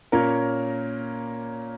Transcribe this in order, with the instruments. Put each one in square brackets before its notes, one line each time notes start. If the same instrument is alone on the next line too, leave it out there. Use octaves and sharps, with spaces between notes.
[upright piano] A#2 A#3 C#4 A#4 C#5